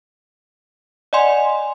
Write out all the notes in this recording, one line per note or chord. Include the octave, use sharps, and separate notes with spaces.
D5 D#5 F#5 G#5 C6